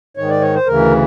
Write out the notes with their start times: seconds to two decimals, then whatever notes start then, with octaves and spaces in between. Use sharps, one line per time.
0.17 G#2 D#3 C#5
0.30 D5
0.41 C#5
0.54 C5
0.66 D2 C#3 E3 A#4